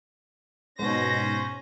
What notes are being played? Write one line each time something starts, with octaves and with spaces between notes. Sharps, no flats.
G#2 B2 C#4 C5 A#6